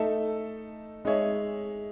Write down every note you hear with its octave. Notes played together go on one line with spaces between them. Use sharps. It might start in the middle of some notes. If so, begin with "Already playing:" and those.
Already playing: A3 D#4 A4 E5
G#3 D#4 G#4 C#5 E5